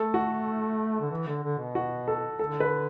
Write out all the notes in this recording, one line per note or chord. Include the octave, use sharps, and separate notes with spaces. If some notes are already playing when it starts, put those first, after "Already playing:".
Already playing: A3 A4
F#4
D3
E3
D3
D3
B2
F#4
A4
D3 A4
B4